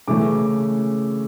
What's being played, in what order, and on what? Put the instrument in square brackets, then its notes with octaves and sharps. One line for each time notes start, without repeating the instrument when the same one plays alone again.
[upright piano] C#3 E3 A3 C#4 D6